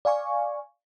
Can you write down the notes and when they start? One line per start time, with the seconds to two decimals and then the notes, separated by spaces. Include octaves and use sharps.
0.05 D5 F5 G#5 C#6